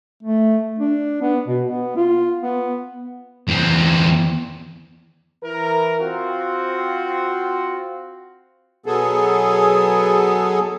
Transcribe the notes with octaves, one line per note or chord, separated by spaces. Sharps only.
A3
D4
B3
B2
B3
F4
B3
E2 C4
E3 A#4
C4 F4 F#4
B2 F#3 B3 G#4 A4